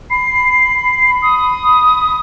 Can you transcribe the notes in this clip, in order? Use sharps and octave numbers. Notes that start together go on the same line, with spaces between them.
B5 C7
D#6